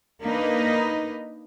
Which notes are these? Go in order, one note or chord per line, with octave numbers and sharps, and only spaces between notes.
A#3 D4 D#4 B4 D#5